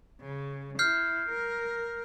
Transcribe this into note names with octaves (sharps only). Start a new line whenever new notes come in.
C#3
E4 F6 G6 C7
A#4